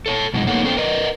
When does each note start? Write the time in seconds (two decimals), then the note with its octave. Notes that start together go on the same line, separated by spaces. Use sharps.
0.06 A4 C#5 A5
0.34 F#2 B2 G#3 D#4
0.47 A#3 B3 D#4 A4 C#5 F#5
0.63 B3 C#4 A4 C5 G5
0.77 A#4 B4 D5 D#5